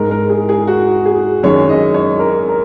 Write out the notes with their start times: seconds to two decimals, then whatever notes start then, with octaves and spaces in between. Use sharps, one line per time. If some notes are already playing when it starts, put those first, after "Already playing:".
Already playing: G#2 G#3 A#4
0.11 A#4
0.30 G#4
0.49 G#4
0.67 F#4
1.06 G#4
1.43 F#2 D#3 G#3 C#5
1.69 D#5
1.94 C#5
2.19 A#4
2.49 A#4